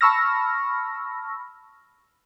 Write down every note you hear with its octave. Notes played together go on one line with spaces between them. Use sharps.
A5 B5 C#6 E6 F6 A#6